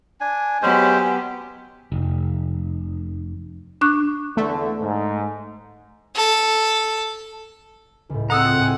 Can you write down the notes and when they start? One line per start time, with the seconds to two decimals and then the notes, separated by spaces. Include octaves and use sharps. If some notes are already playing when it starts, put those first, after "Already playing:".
0.21 D4 G#5
0.62 F#3 G#3 B3 C#4 G4 C5
1.92 F1
3.81 D4 C#6 F#6
4.37 E2 D3 A3
4.80 G#2
6.16 A4
8.09 C#2 A2
8.30 C4 A4 F#5 A#5 D#6 E6
8.44 F4
8.58 A2 A#4 G#5